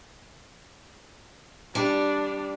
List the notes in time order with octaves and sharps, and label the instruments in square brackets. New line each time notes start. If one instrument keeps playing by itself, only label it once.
[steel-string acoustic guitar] G3 [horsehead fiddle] D4